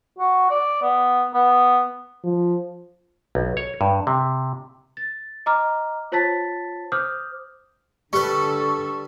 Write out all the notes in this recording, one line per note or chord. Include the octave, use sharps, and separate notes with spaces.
F#4
D5
B3
B3
F3
B1
C#5
G2
C3
A6
D#5 A#5 D6 F6
F4 C5 C#5 A5 A6 B6
C5 D6 D#6 F6 G6
D3 G3 A4 B4 C#6